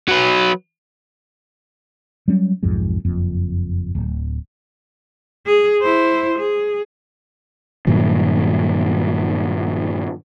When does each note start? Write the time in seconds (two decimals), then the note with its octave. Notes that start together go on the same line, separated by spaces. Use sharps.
0.08 F#3 B4
2.28 F#3 G3 C#4
2.63 B1 F2 G#2
3.05 F#1 F2
3.95 D1
5.46 G#4
5.82 E4 C5
6.38 G#4
7.87 G2 A#2 D#3 F#3